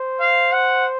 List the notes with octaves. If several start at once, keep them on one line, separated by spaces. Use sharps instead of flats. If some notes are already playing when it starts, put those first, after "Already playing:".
Already playing: C5
F5
F#5